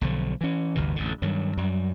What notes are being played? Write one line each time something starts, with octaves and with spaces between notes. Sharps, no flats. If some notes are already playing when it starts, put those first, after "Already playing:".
B1 D3 F3
E3 C#4
G1 D2 C3 E3
A1 F2 D3
G2 D#3 F#3
F#2 F#3 G3